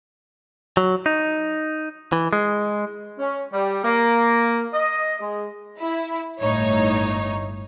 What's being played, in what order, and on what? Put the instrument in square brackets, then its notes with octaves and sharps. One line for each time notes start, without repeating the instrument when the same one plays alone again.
[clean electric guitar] F#3
D#4
E3
G#3
[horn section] C#4
G3
A#3
D#5
G#3
[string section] E4
G1 A2 D#4 C#5